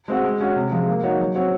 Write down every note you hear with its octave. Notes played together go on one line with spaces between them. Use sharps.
G#3 C4 F#4
G#3
C#4 F#4
C3
F3 G#3
A#3
D#4 F#4 C#5
F#3
C4 F#4 C#5